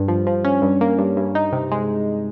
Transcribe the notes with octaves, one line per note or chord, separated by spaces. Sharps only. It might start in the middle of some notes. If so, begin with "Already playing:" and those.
Already playing: G2
F3
F3
C#4
G2
A#3
G2
G2
D#4
C3
G#3